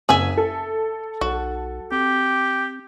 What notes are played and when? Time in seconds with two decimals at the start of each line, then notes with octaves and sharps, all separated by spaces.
0.09 F#1 G#4 E5 G#5
0.37 A4
1.21 B1 F#4
1.92 C4 G4